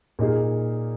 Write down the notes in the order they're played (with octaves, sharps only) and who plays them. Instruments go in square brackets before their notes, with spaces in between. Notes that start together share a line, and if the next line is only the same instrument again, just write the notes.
[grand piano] A#2 A#3 D#4 G#4